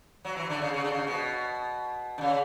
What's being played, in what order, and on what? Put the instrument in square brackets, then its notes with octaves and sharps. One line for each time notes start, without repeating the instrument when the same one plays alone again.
[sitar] F#3
E3
D3
C#3
C#3
D3
C#3
B2
D3
C#3